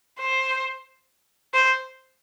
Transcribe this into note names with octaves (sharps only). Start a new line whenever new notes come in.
C5
C5